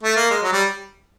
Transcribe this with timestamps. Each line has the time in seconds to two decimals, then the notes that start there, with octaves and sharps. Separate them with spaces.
0.03 A3
0.16 A#3
0.30 G#3
0.42 F#3
0.52 G3